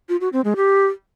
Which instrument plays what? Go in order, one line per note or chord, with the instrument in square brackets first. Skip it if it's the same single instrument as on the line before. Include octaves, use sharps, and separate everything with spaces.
[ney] F4
F#4
C4
G#3
G4